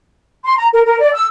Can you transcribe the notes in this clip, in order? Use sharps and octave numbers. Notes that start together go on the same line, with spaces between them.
C6
A#5
A#4
A#4
D5
E6